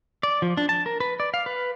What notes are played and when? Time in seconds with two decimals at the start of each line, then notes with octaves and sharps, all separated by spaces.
0.23 D5
0.42 F3
0.57 D4
0.69 A5
0.86 A#4
1.00 B4
1.20 D5
1.34 F5
1.46 B4